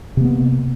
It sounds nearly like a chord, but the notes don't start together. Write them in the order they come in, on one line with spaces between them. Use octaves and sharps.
C3 A#3 B3